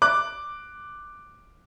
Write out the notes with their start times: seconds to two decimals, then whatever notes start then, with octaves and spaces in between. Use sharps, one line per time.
0.02 D6 F#6